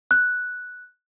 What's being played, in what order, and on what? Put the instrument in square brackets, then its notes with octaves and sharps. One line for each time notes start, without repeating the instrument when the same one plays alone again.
[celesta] F#6